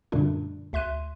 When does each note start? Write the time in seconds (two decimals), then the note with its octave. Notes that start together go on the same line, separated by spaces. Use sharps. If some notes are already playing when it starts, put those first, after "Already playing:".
0.12 F#2 A#2 D3 G3 A3 D4
0.73 D2 E5 C6 F#6 D#7